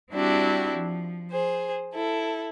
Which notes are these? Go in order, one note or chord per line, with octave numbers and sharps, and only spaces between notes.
G3 C4 D4 E4 F#4 G4
F3
G#4 C5
E4 A4